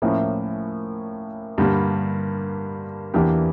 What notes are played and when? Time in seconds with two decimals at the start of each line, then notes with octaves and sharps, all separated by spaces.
0.02 A2 F3 A#3 C#4 E4
1.58 G2 D3 G3 A#3
3.14 E2 E3 A#3 D4 G4